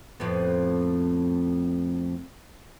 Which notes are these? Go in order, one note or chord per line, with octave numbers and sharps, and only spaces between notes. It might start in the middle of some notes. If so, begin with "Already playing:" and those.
F2 A2 B3